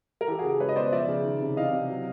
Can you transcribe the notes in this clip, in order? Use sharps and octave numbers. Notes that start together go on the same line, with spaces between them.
A#4
E3 G4 A4
C#3 F#4 G#4
G#3 B4 C#5
D#5
B2 C5 D5
F3 D5 E5
C#3
D#3
C3
E3 D#5 F5
C3
F#3